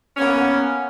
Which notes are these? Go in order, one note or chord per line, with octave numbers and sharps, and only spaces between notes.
A#3 B3 C#4